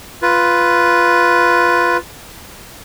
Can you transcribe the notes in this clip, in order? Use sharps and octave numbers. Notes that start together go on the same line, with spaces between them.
F4 B4